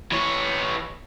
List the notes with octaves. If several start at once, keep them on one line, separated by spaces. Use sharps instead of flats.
E3 C#5